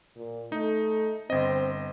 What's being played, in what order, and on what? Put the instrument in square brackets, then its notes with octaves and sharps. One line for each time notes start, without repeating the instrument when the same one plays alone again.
[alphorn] A#2
[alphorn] A3 [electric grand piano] D#4
[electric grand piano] G1 D#5 [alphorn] C4